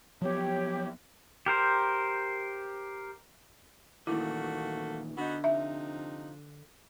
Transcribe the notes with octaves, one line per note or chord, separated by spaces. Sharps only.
F3 F#3 B3 G4 C#5
G4 A#4 C5
A#2 D#3 E3 A3 A#3 E4 F#4
D3 B3 D#4 F#4
C3 F3 D#4 E5